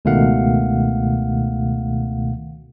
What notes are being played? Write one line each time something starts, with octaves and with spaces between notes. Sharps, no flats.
C#2 B2 D#3 A3 F5 F#5